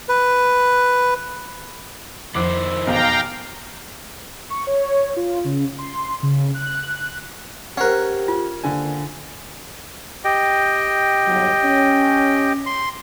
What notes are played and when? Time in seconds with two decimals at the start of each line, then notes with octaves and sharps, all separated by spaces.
0.09 B4
2.35 F2 D#3 F3 E4 C5 D6
2.87 B1 E2 F5 G5 A#5
4.50 C#6
4.67 C#5
5.16 F4
5.44 C#3
5.78 C6
6.23 C#3
6.54 F#6
7.77 C#4 G4 A#4 C5 F#5
8.28 F4
8.64 D3 D#3 A#3 C5 G#5
10.24 G4 D#5 G5
11.27 G1 F#3
11.65 C#4
12.66 C6